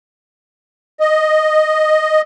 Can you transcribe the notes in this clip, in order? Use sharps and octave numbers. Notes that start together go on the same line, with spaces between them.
D#5